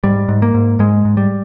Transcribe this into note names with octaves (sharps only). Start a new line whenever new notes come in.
G#2 G3
G#2
A#3
G#2
G#2 G#3
G#2
G3